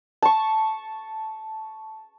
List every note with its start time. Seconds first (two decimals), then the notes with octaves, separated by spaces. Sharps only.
0.22 A5 C#6